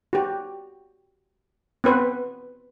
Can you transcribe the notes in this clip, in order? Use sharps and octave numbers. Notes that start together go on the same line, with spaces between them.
F#4 G4
B3 C4 B4 C5